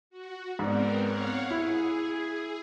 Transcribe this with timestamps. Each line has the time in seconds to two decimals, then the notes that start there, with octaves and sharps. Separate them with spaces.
0.10 F#4
0.59 G#2 B3 C4 A#4 D5
1.00 C#5 F5 F#5
1.51 E4 G#4